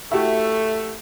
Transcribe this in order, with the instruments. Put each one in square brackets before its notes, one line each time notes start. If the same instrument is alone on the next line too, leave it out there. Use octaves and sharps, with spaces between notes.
[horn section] A3 [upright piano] E4 F#4 G4